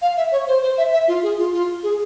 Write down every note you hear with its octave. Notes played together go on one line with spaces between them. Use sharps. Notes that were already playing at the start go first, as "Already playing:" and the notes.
F5
E5
C#5
C5
C5
E5
E5
F4
G#4
F4
F4
G#4